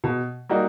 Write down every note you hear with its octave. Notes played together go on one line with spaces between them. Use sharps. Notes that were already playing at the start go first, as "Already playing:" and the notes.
B2
G3 A#3 D#4 F#4